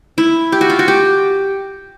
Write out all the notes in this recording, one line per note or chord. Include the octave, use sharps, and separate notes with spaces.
E4
G4
F#4
F4
F#4
G4